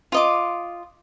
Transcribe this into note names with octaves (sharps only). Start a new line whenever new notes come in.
F4 D#5 D6